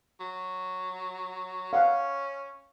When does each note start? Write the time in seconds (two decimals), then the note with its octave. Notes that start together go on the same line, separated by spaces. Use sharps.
0.20 F#3
1.73 C#4 F5 F#5